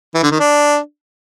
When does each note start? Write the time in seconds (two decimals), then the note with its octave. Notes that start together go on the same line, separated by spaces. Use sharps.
0.15 E3
0.23 D3
0.32 D#3
0.40 D4